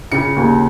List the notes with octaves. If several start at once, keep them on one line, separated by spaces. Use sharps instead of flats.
C#3 C#7
D#2